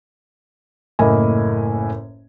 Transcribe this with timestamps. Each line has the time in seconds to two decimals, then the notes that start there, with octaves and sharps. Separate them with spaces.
0.99 F#1 A2 A#3 E4 D#5 G#5